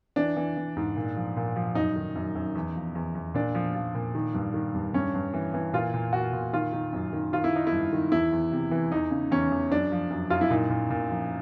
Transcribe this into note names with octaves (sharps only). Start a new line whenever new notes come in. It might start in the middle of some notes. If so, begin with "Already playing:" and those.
E3 D4
E3
E3
G#2
A#2
F3
A#2
F3
F#2 D#4
D#3
F#2
F#2
E2
F3
E2
E2
A#2 D4
F3
F3
A#2
D#3
G2
D#3
G2
G2 C#4
G2
E3
E3
A#2 F4
A#2
A#2 F#4
A#2
D#3 F4
D#3
F#2
D#3
D#3 F4
E4
D#3 D#4
E4
G2
D#3
E2 E4
E2
C3
E3
E2 D#4
C#3
E2 C#4
E2
F#2 D4
F3
F#2
F#2 F4
E4
A#2 D#4
A#2
A#2
F3